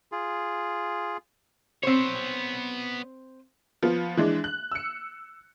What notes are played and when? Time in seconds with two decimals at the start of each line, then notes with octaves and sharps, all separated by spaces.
0.12 F4 G#4
1.83 B3 C4 C5 C#5
3.83 F3 B3
4.17 E3 G#3 D4
4.44 F#6
4.72 E6 C#7